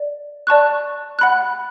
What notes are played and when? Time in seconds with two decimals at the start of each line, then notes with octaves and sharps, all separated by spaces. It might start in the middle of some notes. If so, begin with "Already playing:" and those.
Already playing: D5
0.47 D5 A5 C#6 F#6
1.19 F#5 B5 F#6